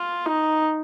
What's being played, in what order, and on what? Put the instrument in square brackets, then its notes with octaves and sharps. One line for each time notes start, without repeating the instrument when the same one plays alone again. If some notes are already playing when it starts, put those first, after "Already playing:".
Already playing: [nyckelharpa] F4
D#4